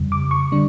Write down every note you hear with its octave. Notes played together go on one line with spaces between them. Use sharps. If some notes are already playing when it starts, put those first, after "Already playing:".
Already playing: F2 C#3 G3
D6
C#6
D3 G3 D4